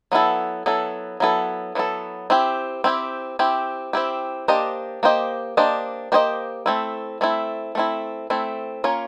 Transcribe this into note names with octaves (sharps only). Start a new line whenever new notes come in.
F#3 B3 E4 A4
F#3 B3 E4 A4
F#3 B3 E4 A4
F#3 B3 E4 A4
C4 E4 G4
C4 E4 G4
C4 E4 G4
C4 E4 G4
A#3 D4 G4 C5 D#5
A#3 D4 G4 C5 D#5
A#3 D4 G4 C5 D#5
A#3 D4 G4 C5 D#5
A3 C4 E4
A3 C4 E4
A3 C4 E4
A3 C4 E4
A#3 C#4 F4 A#4 C#5